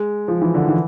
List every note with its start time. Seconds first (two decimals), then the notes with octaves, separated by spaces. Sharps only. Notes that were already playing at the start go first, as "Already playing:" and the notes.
Already playing: G#3
0.28 F3
0.42 E3
0.54 D3
0.68 E3